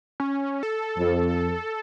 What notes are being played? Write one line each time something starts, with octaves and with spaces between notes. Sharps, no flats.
C#4
A4
F2